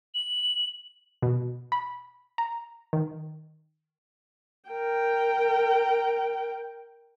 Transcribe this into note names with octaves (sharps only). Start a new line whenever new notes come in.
F#7
B2
B5
A#5
D#3
A#4 G5